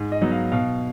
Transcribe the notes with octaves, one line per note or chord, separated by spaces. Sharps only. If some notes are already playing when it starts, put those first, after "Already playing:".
Already playing: G#2
D#5
F#3 B3 D#4
F5
B2 F5